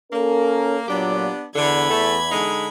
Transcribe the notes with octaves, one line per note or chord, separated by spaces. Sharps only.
A#3 C#4 A4 A#4
A#2 F#3 B3 D4 G4
E2 D3 B5 G#6
A3
D3 G#3 D#4